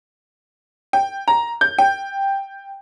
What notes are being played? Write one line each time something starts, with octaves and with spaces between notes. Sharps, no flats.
G5
A#5
G6
G5